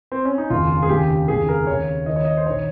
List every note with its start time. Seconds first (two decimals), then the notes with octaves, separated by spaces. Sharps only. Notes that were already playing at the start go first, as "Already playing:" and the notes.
0.12 C4
0.25 C#4
0.38 D#4
0.50 F1 D#2 C#3 F4
0.83 G#4
0.89 F1 D#2 C#3 G4
1.28 F1 D#2 C#3 G#4
1.49 A#4
1.67 D#2 C#3 C#5
2.06 D#2 D#3 D#5
2.16 C#5
2.25 D#5
2.37 C5
2.46 A#1 D#3 C#5